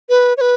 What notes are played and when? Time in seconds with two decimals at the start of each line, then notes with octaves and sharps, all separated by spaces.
0.09 B4
0.37 C#5
0.41 B4